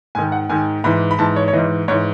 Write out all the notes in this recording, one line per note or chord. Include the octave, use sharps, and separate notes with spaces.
G#2 D#3 G#5
F#5
G#2 D#3 G#5
G#2 E3 B5
B5
G#2 E3 A5
C#5
C#5
G#2 E3 D#5
G#2 E3 C#5